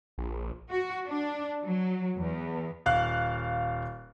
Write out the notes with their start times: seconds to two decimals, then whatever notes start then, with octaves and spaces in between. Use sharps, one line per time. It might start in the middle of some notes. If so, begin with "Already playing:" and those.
0.18 A#1
0.70 F#4
1.05 D4
1.63 F#3
2.16 E2
2.86 D#1 F5 F#6